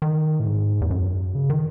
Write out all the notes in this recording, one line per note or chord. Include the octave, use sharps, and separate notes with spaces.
D#3
A2
G#2
E2
F#2
C#3
D#3